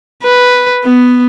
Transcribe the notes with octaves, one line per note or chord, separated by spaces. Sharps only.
B4
B3